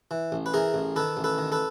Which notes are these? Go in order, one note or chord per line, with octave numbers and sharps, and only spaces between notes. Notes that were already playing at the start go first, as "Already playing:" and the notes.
E3
A1
B4
E3 G#4 A#4
A1
D#3 A4 B4
A1
A4 B4
D#3
A4 B4